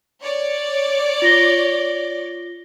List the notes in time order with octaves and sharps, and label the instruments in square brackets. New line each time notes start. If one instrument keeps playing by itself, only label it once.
[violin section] C#5 D5
[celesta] F4 A#6 G7